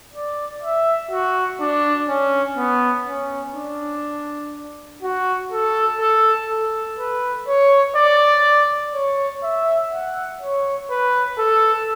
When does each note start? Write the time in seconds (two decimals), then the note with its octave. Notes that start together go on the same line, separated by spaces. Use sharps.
0.14 D5
0.63 E5
1.11 F#4
1.61 D4
2.09 C#4
2.58 B3
3.07 C#4
3.56 D4
5.03 F#4
5.52 A4
6.00 A4
6.50 A4
6.99 B4
7.48 C#5
7.96 D5
8.94 C#5
9.43 E5
9.92 F#5
10.41 C#5
10.91 B4
11.39 A4